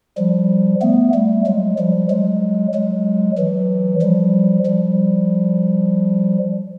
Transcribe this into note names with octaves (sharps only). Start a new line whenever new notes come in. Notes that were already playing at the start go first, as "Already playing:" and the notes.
F3 G3
A3 B3
G3 A3
F#3 G#3
F3 G3
F#3 G#3
F#3 G#3
E3 F#3
F3 G3
F3 G3